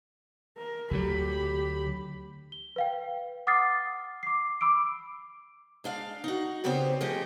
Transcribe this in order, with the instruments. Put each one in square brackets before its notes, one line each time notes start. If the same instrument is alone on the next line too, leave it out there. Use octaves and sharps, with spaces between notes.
[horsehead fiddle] A#4
[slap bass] D2 D3 F#3 [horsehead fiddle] G4 B5
[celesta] G7
B4 F5 G5
F#5 D6 D#6 F6 A6 C7
D6 C7
B5 D6 E6 D7
[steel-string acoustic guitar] G#3 D4 F5
D#4 F#4
A#2 C#3 B3 C4 G4 C5
F3 G3 A3 G4 G#4 D#5